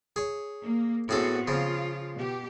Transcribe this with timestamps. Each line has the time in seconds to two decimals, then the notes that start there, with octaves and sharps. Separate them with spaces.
0.16 G#4 C#5
0.64 A#3
1.09 A2 B3 C4 F#4 G#4 A4
1.47 C#3 F3 F4
2.14 B2 G4